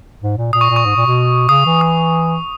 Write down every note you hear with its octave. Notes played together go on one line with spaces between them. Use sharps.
G#2
A#2
A#2 D#6
C#6
A#2
C#6
G#2
A#2
B2
C#3 D#6
E3
D#6